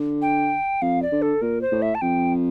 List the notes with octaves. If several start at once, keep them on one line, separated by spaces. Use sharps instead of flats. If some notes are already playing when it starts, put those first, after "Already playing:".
Already playing: D3
G5
F2 F5
D5
D3
A4
A#2 A#4
C5
A2
E5
A5
F2 G5